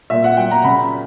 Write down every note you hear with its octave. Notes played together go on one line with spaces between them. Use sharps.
A#2 E5
F#5
F#3 G5
A#5
C#3 B5